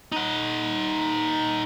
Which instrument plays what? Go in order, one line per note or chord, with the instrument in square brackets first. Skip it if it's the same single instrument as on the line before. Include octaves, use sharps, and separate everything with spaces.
[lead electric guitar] D#4 F#5